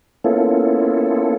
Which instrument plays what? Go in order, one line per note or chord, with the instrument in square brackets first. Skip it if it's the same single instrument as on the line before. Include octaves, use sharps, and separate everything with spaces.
[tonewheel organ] A#3 B3 C#4 E4 F4 A4